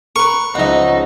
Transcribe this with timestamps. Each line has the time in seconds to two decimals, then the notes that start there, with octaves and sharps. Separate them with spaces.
0.16 A#4 B4 C#6
0.55 C#2 C#3 F3 D#4 E5 F#5